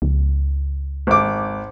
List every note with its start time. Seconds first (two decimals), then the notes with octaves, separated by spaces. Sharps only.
0.02 C#2
1.07 G#1 D6